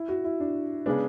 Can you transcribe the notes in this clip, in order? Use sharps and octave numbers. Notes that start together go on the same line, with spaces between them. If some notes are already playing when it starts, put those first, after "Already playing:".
Already playing: E4
F#4
E4
D4
C#3 G#3 B3 D4